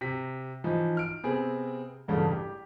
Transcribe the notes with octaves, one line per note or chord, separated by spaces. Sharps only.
C3 B6
E3 F3 D#4
F6 D7
C3 B3 C4 G#4
E1 A1 G2 C#3 A3 A5
G4